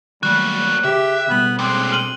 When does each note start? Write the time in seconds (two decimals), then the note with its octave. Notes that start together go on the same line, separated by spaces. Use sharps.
0.23 D#3 F#3 G3 A3 A#3 F#4 F#6
0.84 C#3 G4 E5
1.30 B2 G3 B3
1.59 A#2 G#3 C4
1.92 F6 D#7 F#7